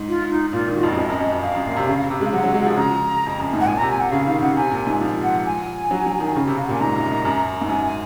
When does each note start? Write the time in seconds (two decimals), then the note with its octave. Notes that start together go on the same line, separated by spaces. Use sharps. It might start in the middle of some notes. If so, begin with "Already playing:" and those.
Already playing: G#2
0.08 F4
0.30 D#4
0.53 A#2 F4
0.68 D#3
0.76 F#4
0.82 F2 F4
0.89 F#4
0.92 F#2
0.98 F2 D#5
1.09 F#2
1.20 F#2
1.32 F2
1.42 F2 F5
1.55 F#2
1.66 A#2
1.76 C3
1.88 C#3
2.10 C3
2.21 G#3 F5
2.32 F#3 F#5
2.44 F#3
2.54 G#3
2.66 F3
2.77 C#3 A#5
3.26 F2
3.40 F#2
3.53 G#2
3.60 F#5
3.66 A#2 G#5
3.78 C3 A#5
3.90 G#5
4.00 F#5
4.11 C#3 F5
4.27 D#3 F5
4.41 C#3 F#5
4.56 C3 G#5
4.71 A#2
4.87 G#2
5.01 F3
5.23 F#5
5.46 G#5
5.91 F#3
6.06 F#3
6.20 D#3
6.36 C#3
6.47 C3
6.57 C3 F5
6.66 F#5
6.69 A#2 G#5
6.80 G#2 A#5
6.96 F#2
7.10 F2
7.25 F#2
7.61 G#2
7.69 F#2 G#5
7.85 G#5